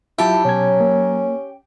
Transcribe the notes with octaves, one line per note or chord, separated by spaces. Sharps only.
F#3 E4 F4 G4 E5 A5
B2 F#3 C#4 G#6
A#3